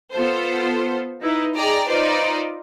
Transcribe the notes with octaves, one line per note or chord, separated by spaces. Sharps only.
B3 F4 A4 C5
D#4 E4 B4
G#4 D5 D#5 G5 A#5
D#4 F4 B4 C5 D5